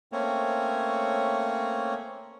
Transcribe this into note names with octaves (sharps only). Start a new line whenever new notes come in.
A3 A#3 C4 C#4 C#5